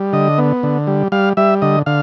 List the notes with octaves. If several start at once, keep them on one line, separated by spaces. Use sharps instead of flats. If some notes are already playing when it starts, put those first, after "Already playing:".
Already playing: G3
D3 D#5
B3
D3
G3
G3 F5
G3 E5
D3 D#5
D3 F5